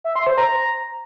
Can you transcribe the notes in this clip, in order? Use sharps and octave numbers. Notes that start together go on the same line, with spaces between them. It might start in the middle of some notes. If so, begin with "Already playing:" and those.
E5
C6
C5
A#5